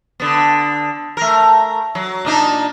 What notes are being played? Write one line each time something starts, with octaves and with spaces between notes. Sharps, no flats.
D3 B3
A3 A#4
F#3
A#2 D4 D#4